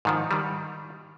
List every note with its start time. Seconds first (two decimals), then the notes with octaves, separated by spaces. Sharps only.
0.05 G#2 D#3 F3
0.31 D#3 G3